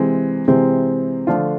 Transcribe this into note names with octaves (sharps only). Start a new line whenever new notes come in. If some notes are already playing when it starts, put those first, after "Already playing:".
Already playing: C3 E3 G#3 C4
C3 E3 G#3 C4
D3 F3 A3 D4 F4